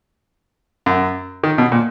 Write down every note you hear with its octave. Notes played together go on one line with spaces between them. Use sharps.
F#2
D#3
B2
A#2